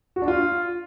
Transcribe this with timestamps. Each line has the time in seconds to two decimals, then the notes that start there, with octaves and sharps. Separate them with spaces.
0.16 F#4
0.22 D4
0.28 F4